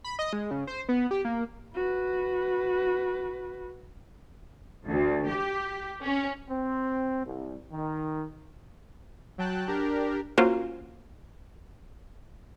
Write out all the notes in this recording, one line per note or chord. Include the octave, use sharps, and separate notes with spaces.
B5
D#5
G#3
C#3
C5
B3
G4
A#3
F#4 B4
D2
G4
C#4
C4
C2
D#3
F#3 G5 A5 F#6
D4 G4 A#4
A#3 C#4 F4 F#4 A#4 C5